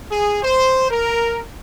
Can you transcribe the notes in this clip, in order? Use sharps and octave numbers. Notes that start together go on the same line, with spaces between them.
G#4
C5
A#4